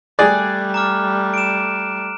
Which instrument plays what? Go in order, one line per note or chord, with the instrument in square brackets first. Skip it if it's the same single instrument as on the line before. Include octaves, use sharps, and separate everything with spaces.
[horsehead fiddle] G3 A3 [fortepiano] G#4 D5 [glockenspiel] F#6
[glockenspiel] A#5 D6 F6
D7 E7